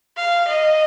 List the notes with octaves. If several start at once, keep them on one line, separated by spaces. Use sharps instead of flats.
F5
D#5